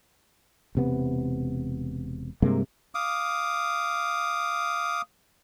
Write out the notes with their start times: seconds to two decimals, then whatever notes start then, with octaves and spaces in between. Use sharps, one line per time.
0.75 E1 C3 B3
2.42 G2 C3 G#3 A#3
2.95 F5 D6 D#6